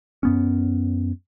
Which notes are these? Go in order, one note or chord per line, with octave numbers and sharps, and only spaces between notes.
F#2 B3 C#4